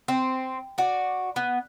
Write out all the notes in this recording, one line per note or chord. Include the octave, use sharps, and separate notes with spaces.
C4
F#4 D5
B3